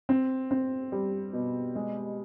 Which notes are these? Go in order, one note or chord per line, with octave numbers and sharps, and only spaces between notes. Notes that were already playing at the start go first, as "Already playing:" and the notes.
C4
C4
G3
B2
G#3